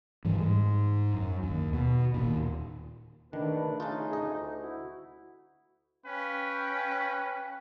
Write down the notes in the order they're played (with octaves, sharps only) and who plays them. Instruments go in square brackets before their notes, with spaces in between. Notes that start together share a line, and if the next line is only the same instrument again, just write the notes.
[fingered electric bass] G#2 E3 G3
G#2
F#2
D#2
B2
D#2 A#2
[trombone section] A#1 D3 B4 [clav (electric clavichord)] D#3 [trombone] A3 [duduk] D4
[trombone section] C#3 G#4 [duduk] D#4 [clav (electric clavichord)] F4 A5
[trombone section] D2 [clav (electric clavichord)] D#5
[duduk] E4 [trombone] F#4
[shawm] C#4 [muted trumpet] B4 [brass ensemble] F5 G5